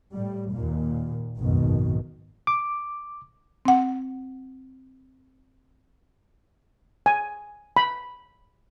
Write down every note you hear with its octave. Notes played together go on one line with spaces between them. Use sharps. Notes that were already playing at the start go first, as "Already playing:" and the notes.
A2 G3
D#2 A#2
F#1 B1 F2 G#2 B2 D#3
D6
C4 F#5
G#5
B5